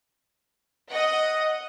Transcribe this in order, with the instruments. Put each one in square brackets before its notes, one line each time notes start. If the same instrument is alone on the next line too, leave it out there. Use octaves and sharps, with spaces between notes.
[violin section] D#5 F#5